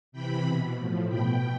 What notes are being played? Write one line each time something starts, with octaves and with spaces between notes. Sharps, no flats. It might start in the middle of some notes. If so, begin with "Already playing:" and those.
C3 E3 G5 B5
B2
A2 F3
B2 G5 B5